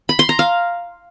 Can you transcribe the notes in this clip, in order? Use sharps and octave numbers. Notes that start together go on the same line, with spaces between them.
B5
C6
A#5
F5